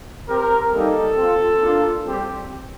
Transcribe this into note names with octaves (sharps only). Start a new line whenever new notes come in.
C4 G4 A#4
G3 A#3 D#4 G4 A4
C4 F4
A#3 D4 F4
G3 C4 G4